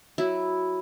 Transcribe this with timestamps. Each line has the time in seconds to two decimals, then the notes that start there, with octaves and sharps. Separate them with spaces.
0.18 F#3 E4